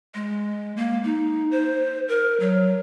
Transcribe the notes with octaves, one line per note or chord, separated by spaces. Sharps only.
G#3
A#3
D#4
C5
A#4
F#3